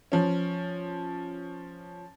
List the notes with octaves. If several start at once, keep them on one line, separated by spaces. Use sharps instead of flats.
F3 C#4